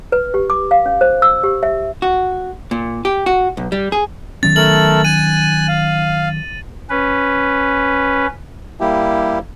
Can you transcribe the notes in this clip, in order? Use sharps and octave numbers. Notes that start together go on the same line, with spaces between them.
B4
G4
D6
F5
C#4
C5
E6
G4
E5
F#4
A#2
G4
F#4
B1
G3
G#4
D#3 F#3 C#4 A6
A3 A4 A#4 F#7
G#5 F#6 D#7
F5
C#4 B4
G3 A#3 E4 G4